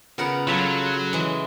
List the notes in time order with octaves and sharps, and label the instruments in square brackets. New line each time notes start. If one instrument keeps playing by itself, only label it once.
[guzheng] C#3 A#4 F#5 [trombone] B3 [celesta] F4 B5
[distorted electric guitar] F#3 [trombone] F4 [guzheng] A4 C#5 [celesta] B5 B6 E7
[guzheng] E3 G#3 [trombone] E4